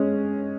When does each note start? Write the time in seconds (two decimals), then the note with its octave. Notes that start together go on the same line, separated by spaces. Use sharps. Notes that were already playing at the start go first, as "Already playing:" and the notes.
Already playing: G#3 C#4